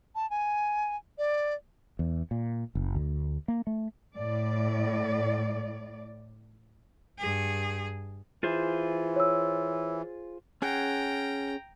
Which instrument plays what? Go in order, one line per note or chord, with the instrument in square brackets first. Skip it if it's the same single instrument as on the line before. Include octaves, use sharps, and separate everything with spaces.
[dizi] A5
G#5
D5
[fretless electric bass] E2
A#2
F#1
D2
A#3
A3
[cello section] A2 D5
[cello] G2 G#4
[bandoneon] E3 [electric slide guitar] F4 G#4 C5
[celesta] C#5 E6
[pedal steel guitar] C#4 G#4 F#5 [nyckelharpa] G5 A#5